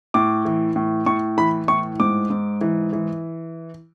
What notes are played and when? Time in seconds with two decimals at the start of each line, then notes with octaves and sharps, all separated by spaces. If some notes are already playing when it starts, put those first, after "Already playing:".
0.14 A2 D6
0.45 E3
0.76 A2
1.06 A2 C#6
1.37 E3 B5
1.68 A2 C#6
2.00 G#2 D6
2.30 G#2
2.61 E3
2.93 E3